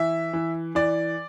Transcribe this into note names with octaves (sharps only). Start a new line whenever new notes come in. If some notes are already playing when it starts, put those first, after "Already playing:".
Already playing: E3 E5
E3
E3 D5